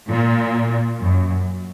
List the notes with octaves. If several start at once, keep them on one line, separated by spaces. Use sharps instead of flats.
A#2
F#2